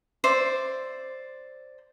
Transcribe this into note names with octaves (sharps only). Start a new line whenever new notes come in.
C5 D5 E5